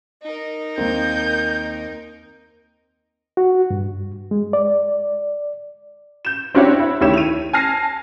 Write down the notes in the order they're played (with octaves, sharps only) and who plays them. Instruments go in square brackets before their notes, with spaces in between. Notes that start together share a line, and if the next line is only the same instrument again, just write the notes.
[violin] D#4 A#4
[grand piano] D#2 A#3 C4 [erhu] G6
[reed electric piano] F#4
G2
G#3
D5
[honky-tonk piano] G6 E7
C4 D4 E4 F#4 G4 C#5
E4
D2 D#3 E4 G4 C#5 E7
D#7 F7
G#5 A5 F6 A#6 C7